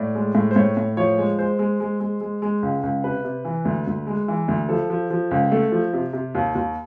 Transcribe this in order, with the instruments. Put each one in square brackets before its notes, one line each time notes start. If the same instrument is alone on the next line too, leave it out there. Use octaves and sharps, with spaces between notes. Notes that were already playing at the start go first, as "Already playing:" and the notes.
Already playing: [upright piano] A2 D5
G#3
A2
C5
A2 C#5
A2
F3 C#5
G#3
G#3 C5
G#3
G#3
G#3
G#3
G#3
C#2
C#2
C3 B4
C3
E3
D2
D2
G#3
E3
D2
F3 A4
F3
F3
C#2
A3
F3
C3
C3
D#2
D#2